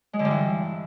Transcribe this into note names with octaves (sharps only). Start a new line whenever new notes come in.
G#3
D3
G2
E3